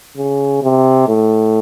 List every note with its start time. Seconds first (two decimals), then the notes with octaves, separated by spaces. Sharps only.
0.17 C#3
0.63 C3
1.08 A2